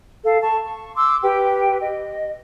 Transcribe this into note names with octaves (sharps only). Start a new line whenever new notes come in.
A4 F5
A5 C#6
C#6
C6 D6 E6
G4 B4 G5
D#5